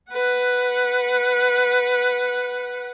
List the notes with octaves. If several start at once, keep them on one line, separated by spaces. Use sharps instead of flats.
B4 F#5